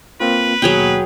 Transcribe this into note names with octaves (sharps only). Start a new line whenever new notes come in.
A#3 C4 F4 B4
D#2 B2 F#3 G#4 G5